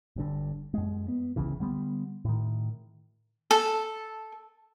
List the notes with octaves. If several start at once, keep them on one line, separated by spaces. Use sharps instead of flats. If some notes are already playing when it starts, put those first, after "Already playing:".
G1 G2 D3
F#2 G#3
B3
G1 C#2 C#3 E3
D3 G3 B3
A2 D#3
A4